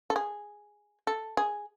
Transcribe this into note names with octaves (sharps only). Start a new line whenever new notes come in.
A4
G#4
A4
G#4